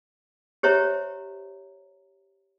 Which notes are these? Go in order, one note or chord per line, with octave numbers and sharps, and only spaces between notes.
G4 C5 C#5 E5 A#5